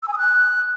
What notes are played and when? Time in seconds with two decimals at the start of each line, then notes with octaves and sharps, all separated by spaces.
0.03 E6
0.08 G#5
0.13 D#6
0.18 F#6